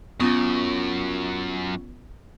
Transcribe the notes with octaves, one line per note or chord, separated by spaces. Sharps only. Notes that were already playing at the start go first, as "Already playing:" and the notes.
F#2 B3 C#4 F4 C#6 D#6